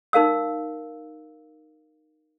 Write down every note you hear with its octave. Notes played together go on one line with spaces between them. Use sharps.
D#4 A#4 F5 E6